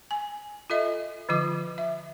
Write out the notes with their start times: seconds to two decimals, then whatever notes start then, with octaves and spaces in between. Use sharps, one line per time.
0.11 G#5
0.70 F4 A4 D#5 E5
1.29 D3 F3 F4 D6
1.78 E5